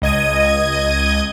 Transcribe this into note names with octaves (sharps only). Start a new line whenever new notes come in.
C#2 D#5 G#6 D#7